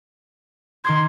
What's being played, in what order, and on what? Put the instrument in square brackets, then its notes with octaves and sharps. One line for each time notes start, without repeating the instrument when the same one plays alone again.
[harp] D#3 D6 G#6 [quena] C6